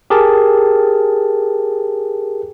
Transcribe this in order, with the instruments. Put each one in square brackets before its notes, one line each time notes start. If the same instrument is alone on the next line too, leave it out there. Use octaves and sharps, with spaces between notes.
[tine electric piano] G4 G#4 A#4 A5